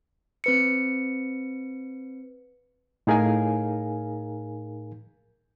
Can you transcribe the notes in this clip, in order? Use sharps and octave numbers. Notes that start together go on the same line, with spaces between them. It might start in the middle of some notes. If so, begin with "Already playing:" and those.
C4 B4 C#7
A2 D#4 G#4 A#4 F5 G#5